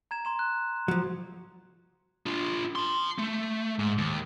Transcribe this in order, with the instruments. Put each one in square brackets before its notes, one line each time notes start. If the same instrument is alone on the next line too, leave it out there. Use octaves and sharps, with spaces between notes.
[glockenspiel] A#5 G#6 E7
A#5 C6 E7
F#6
[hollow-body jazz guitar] F3 F#3
[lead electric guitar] D4 F4
A5 C6
A3
G#2
D#2